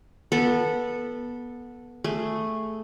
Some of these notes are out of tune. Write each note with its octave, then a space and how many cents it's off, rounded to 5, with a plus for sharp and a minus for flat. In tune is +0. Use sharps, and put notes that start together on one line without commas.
B3 -20 A4 +0
A3 +0 G#4 +0